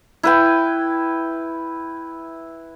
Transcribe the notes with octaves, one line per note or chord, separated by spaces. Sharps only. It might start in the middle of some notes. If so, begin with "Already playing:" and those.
E4 B4 G5